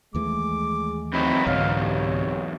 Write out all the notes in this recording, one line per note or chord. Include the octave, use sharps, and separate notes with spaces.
D#2 E3 G#3 A3 D6
E2 F#3 C4 D#4 B5
C2 G#2 D3 C#5 F5
C3 C#5